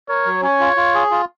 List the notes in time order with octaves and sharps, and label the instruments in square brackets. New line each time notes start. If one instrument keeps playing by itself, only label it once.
[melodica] A#4 [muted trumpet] C#5
[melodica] F#3
[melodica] C#4 [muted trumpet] C#5
[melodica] F4
F4
G#4
F4